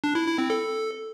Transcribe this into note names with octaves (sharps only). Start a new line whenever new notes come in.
D4
E4
E4
C4
A4